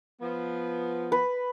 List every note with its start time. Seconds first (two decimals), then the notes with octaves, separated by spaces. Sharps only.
0.21 F3 B3
1.12 B4